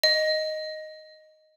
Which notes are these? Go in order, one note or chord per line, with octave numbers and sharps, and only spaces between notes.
D#5